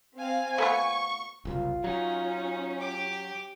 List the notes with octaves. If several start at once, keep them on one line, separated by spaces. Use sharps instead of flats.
C4 F5 G#5
A3 B3 F4 C#6
F#1 C2 F4
F#3 C#4 D#4
G4 D6